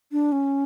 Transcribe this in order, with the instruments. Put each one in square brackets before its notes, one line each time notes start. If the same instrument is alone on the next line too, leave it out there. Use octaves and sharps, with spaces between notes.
[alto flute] D4
C#4